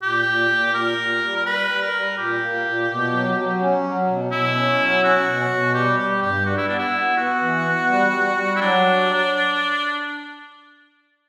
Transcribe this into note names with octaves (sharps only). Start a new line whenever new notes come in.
A#2 G4
A#2
A#2
A#2 A#4
A#2
G3
A#4
G3 B4
G3
A#4
G3
A#2 G4
A#3
A#2
B2
F#3
F#3
C#4
F#3
B2
B2 E4
C#4
F#3
C#4 F#4
B2
B2
G3 G4
G3 G4
G2 G4
G3 F#4
E4
B3 D4
E4
B3
B3 F#4
E3
B3
G3
G3
G3
E4
F#3 D4